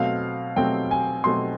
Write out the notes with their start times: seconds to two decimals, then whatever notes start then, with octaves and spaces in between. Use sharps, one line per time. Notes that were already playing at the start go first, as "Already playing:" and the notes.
Already playing: B2 F#3 A3 C4 F5
0.56 B2 F#3 A3 C4 G5
0.91 G#5
1.24 B2 F#3 A3 C4 C6